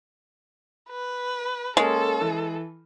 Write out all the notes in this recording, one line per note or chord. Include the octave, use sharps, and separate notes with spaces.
B4
G#3 A#3 C#4 A4 A#4
E3